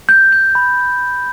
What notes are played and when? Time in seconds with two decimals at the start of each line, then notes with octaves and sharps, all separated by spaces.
0.09 G6
0.32 G6
0.55 B5